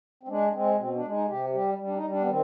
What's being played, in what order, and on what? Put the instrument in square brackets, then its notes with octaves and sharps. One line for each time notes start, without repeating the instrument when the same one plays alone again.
[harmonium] C4
G#3 D4
G#3 C4
B2 C4
D4
G#3
D#4
C3 G4
G3 G4
G3
D4
D#4
G3
D4
B3
D#3 C4